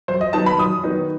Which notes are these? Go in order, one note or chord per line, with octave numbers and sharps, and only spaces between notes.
F#2 C5
D#5
D#3 F#3 B3 D#4 A5
B5
F#2 D#6
D#3 F#3 B3 D#4